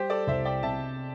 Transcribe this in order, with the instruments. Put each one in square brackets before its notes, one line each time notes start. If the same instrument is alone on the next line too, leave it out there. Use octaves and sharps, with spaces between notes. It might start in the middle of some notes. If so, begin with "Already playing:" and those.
Already playing: [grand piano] G3 [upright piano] G4 C5
[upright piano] A4 D5
[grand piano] C2 [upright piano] C5 E5
[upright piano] D5 G5
[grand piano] C3 [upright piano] E5 A5